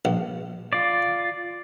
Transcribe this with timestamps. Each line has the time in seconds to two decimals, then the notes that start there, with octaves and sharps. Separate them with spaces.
0.05 A#1
0.73 F4 D5